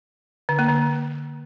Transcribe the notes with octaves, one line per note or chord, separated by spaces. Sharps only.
D3
A#3
D3